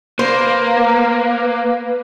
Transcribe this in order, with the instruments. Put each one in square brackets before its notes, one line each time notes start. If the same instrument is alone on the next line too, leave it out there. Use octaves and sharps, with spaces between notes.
[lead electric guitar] A#3 [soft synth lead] B4 [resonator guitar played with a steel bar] C5